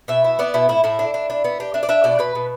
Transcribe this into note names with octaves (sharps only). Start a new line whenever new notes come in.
B2 E5
E4
B3 D5
B2 E4
A2 E4
A2 E4
D4
D4
D4
B3
D4 G4
D4 E5
D5
D4 E5
B2 D5
B2 B4
B2